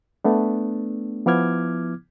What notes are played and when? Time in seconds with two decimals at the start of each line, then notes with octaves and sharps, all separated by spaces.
0.24 A3 B3 D4
1.26 F3 B3 E4 D6 F6 G#6